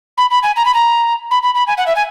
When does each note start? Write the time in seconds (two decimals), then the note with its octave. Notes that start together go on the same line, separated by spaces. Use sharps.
0.17 B5
0.30 B5
0.43 G#5
0.56 A#5
0.65 B5
0.74 A#5
1.30 B5
1.42 B5
1.54 B5
1.67 G#5
1.77 F#5
1.86 E5
1.95 G#5